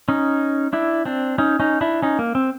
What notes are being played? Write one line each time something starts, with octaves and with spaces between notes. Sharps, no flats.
C#4 D#4
D4 E4
C4 D4
C#4 D#4
C#4 D#4
D4 E4
C#4 D#4
A#3
C4